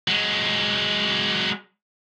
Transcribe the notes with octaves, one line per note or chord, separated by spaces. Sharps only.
F#3 G#3